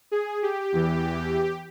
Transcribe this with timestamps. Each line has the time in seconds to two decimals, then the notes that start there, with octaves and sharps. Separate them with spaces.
0.11 G#4
0.43 G4
0.72 E2 E3